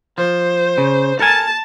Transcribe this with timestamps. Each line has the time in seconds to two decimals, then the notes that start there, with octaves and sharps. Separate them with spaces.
0.18 F3 C5
0.78 C#3
1.20 A4 A#4 G#5 A5